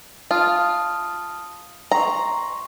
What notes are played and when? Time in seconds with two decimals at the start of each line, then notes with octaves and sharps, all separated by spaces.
0.31 F4 A5 D#6 F6
1.91 A#5 C6 C#6